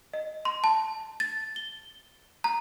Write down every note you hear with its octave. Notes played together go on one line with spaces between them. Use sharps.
D#5
C6
A5
A6
G7
A#5